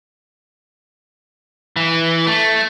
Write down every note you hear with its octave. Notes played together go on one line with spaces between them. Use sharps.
E3
A3